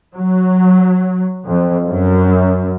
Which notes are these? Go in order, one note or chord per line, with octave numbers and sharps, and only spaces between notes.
F#3
F2
F#2